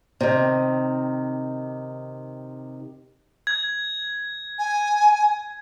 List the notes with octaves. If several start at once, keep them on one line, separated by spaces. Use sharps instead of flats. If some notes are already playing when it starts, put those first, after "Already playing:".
C3 D#3
G#6
G#5